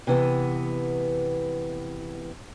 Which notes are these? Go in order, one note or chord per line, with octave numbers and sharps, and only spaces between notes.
C3 E3 B3